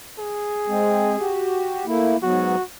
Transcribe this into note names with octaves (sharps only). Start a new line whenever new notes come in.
G#4
G#3 C4
F#4 G4
A3 A#3 E4
G#2 F#3 B3 F#4